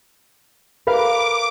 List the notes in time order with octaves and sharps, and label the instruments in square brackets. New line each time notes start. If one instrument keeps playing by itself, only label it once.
[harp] A#4 B4 F5 [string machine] D6